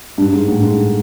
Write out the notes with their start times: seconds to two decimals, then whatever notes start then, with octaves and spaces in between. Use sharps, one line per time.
0.18 G2
0.32 G#2
0.48 A2
0.63 G#2